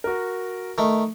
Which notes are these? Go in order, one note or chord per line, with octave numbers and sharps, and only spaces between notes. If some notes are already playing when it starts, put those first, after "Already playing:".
F#4 A#4
D#3 A3